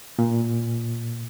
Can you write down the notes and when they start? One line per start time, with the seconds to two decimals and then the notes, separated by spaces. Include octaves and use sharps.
0.19 A#2